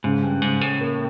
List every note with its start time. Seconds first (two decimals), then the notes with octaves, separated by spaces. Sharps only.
0.04 G#2 C#3
0.23 G2
0.42 G#2 C#3
0.61 A2
0.81 A#3